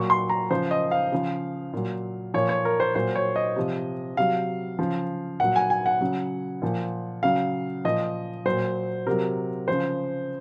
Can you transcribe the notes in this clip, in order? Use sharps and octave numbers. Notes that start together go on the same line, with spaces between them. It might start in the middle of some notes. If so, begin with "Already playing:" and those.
Already playing: A#2 F#3 C#6
C6
A#5
C#3 F3 C5
D#5
F5
C#3 F3
A#2 F#3
A#2 F3 C#5
C#5
A#4
C5
A#2 F#3 C5
C#5
D#5
C3 F3
C3 F#3 F5
C#3 F3
A#2 F#3 F#5
G#5
G#5
F#5
C#3 F#3
A#2 F3
C#3 F#3 F5
A#2 F3 D#5
A#2 F#3 C5
C3 F#3 A#4
C#3 F3 C5